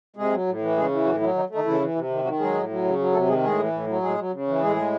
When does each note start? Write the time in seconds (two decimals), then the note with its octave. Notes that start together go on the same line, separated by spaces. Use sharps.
0.16 C3 G#3 G#4
0.32 F#3
0.47 A2
0.61 E3
0.76 C#3 G#3 G#4
0.91 E3
1.05 A2 F#3 F#4
1.20 E3 F#3 E4
1.35 D#3 D#4
1.50 A3
1.55 D#3 D#4
1.65 C#3 E3 E4
1.80 E3
1.95 C3
2.09 D#3
2.24 D#3 F#3 F#4
2.39 F#3 G#3 G#4
2.54 A2
2.69 F#3
2.84 C#3
2.98 F#3
3.13 C3 A3 A4
3.28 D#3 G#3 G#4
3.43 A2 G#3 G#4
3.58 E3
3.72 A2
3.87 F#3
4.02 A2 G#3 G#4
4.18 F#3
4.32 C#3
4.47 E3
4.61 A2 G#3 G#4
4.76 G#3